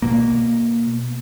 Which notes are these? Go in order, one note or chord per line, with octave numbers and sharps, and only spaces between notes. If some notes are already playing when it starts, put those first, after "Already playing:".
B2 A#3